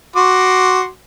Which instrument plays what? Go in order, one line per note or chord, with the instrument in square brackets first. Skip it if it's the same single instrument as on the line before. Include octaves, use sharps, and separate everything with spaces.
[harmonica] F#4 C6 D6